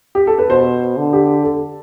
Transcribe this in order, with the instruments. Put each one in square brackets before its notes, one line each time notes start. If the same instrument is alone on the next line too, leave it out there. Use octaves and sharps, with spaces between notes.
[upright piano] G4
A4
B4
[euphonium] B2 [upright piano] C5
[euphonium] D3
[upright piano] G4
A4